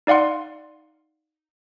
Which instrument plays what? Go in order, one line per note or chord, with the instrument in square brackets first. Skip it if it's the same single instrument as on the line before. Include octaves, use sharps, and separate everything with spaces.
[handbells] D#4 D5 F5 F#5 C6